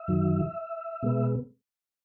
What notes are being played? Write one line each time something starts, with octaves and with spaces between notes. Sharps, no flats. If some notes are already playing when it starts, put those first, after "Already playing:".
Already playing: E5
F#2 D#3 F#3
B2 G#3 B3